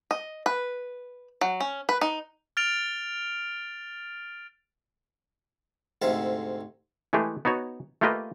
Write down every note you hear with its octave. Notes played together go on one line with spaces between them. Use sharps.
D#5
B4
F#3
C#4
B4
D#4
F6 A6 D7 F7
D2 G#2 C3 A4 E5 F5
E3 G#3 A3 G4 G#4
B3 D#4 F#4 C#5
A3 A#3 F4 G4 B4 D#5